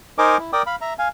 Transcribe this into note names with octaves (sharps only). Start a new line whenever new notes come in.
D#4 A#4 C5 D#5 G#5 D6
E4
A#4 D5 G5 D6 D#6
F5 B5
E5 A#5
F5 G#5